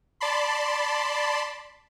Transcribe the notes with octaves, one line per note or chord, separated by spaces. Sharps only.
D5 A5 B5 C6